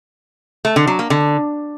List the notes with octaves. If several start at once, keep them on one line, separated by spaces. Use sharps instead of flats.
A3
D3
F#3
A#3
D3